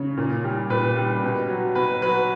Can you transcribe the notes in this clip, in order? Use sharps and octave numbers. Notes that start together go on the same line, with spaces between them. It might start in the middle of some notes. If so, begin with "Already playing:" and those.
Already playing: C#3 C#5
A#2
G3
A#2 B4
G3
B2
F#3
B2 B4
F#3 B4